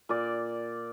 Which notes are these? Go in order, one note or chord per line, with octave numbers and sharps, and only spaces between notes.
A#2 D5